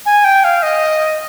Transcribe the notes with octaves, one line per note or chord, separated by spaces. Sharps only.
G#5
G5
F5
D#5